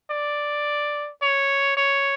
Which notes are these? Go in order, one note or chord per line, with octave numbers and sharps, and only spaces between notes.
D5
C#5
C#5